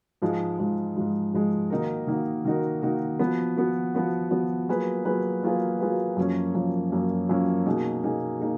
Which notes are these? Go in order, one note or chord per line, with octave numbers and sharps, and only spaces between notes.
G#2 F3 G#3
G#2 F3 G#3
G#2 F3 G#3
G#2 F3 G#3
D#3 A#3 D#4 F#4 A#4
D#3 A#3 D#4 F#4 A#4
D#3 A#3 D#4 F#4 A#4
D#3 A#3 D#4 F#4 A#4
F3 B3 F#4
F3 B3 F#4
F3 B3 F#4
F3 B3 F#4
F#3 A#3 F4 G#4 B4
F#3 A#3 F4 G#4 B4
F#3 A#3 F4 G#4 B4
F#3 A#3 F4 G#4 B4
F#2 F3 A#3 C#4
F#2 F3 A#3 C#4
F#2 F3 A#3 C#4
F#2 F3 A#3 C#4
B2 A#3 D#4 G#4
B2 A#3 D#4 G#4
A#3 D#4 G#4